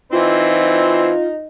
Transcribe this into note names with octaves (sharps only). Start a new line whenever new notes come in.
E3 C4 D#4 F4 C5